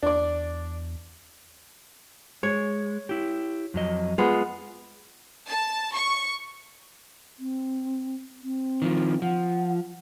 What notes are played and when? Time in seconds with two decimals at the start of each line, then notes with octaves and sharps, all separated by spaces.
0.03 E2 D4 D5
2.43 G#3 C#5
3.09 E4 G4
3.74 F2 F#3 D#5
4.18 G#3 B3 F4
5.48 A5
5.94 C#6
7.39 C4
8.43 C4
8.82 D#3 F3
9.22 F3 F#5